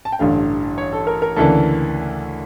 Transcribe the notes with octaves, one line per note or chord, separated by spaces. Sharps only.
A5
G5
A1 G2 D3 A3 F5
C#5
A4
A#4
A#4
D2 C#3 E3 A#3 D4 A4